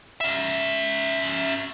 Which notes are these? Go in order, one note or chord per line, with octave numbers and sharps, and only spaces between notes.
C#4 E5